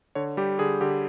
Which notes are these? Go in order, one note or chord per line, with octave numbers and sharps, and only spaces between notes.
D3 C#5
G3 G4
D3 G#4
D3 G4